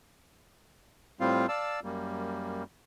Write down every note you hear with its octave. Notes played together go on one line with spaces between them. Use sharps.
A2 G3 C4 F4 F5
D5 F5 A5 E6
F#2 G3 A#3